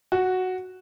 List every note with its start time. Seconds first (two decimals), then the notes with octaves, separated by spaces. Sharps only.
0.12 F#4